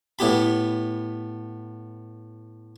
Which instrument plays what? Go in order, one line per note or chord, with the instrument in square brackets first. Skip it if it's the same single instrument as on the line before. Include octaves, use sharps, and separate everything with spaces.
[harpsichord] A2 B3 G4 B5